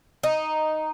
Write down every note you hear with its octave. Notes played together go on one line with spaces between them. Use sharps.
D#4